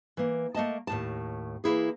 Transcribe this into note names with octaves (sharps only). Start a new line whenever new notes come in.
E3 A#3
A3 A#3 D#5 A5
D#2 A2 A5
E3 A#3 E4 G#4